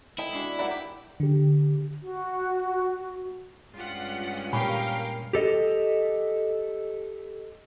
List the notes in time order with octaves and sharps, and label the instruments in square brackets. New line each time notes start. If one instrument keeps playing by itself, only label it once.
[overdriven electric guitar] E4 [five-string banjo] A4 D#5 G5
[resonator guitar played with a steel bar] G#3 D4 F#4
[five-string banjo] A#3 D5 B5 [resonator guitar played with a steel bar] E5 F#5
[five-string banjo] E4 G4
[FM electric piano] D3 G4
[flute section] F#4
[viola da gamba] G2 G#3 C#4 [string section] F4 G4 F#5
[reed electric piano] A#2 G#5 B5 [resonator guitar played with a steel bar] G4 C#5 [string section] A#4 F5 G5
[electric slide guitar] G4 A4 D#5